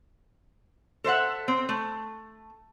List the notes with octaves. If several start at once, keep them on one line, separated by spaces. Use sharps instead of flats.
A4 C5 E5 F#5
C4
A3